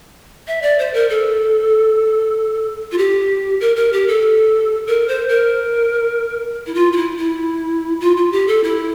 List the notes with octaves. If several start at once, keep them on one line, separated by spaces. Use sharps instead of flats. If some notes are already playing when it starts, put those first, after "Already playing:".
E5
D5
C5
A#4
A4
F4
G4
A#4
A#4
G4
A4
A#4
C5
A#4
E4
F4
F4
E4
E4
F4
F4
G4
A4
E4